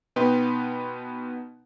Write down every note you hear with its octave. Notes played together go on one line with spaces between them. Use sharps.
B2 B3 D#4 B4 G5 C6